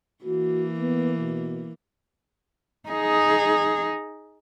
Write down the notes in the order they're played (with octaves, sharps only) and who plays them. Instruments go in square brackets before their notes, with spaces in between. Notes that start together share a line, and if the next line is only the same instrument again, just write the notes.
[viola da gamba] E3 A#3 [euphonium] F#4
[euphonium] B3
B2
[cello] D#4 G#4